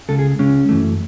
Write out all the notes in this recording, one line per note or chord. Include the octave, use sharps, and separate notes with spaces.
C#2 C#3 G#3 A4
G#4
C#2 C#3 G#3 C#4
F#2 E3 A3